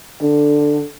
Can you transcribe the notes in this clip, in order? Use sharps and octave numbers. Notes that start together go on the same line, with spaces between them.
D3